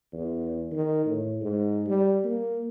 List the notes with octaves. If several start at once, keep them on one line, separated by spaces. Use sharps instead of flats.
E2
D#3
A2
G#2
G3
A#3